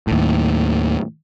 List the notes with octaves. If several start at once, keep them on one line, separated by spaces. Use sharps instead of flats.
D#2 A2